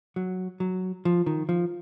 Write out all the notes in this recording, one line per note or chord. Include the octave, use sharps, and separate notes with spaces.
F#3
F#3
F3
D#3
F3